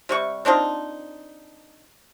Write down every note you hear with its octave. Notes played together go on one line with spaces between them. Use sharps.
C3 G3 C#6
C4 D4 D#4 F4